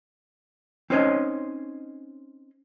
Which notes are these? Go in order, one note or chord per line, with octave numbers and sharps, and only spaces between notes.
C4 C#4 D#4 C5 C#5 D#5